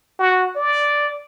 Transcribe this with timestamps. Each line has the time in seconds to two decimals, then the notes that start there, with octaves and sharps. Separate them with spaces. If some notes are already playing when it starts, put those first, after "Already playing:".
0.19 F#4
0.56 D5